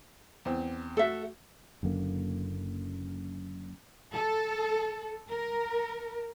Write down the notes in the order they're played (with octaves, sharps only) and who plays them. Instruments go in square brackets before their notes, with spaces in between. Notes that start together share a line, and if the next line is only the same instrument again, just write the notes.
[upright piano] E2 C4
[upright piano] A3 F#4 [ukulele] A4 E5
[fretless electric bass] F#1 F#2 D3 A#3
[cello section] A4
A#4